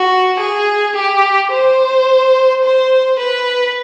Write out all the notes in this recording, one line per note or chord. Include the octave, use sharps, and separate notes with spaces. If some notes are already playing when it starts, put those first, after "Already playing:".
Already playing: F#4
G#4
G4
C5
C5
B4